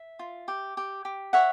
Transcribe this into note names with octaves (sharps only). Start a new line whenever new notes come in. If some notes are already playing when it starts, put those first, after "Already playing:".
Already playing: E5
F4
G4
G4
G4
C#5 E5 F#5